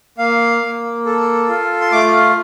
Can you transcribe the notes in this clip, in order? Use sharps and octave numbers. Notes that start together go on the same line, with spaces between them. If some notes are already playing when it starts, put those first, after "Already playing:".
A#3 F5
A#3
A4
F4
C6
A3 D6